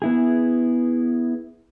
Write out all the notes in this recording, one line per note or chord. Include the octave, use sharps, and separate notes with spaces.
B3 E4 G#4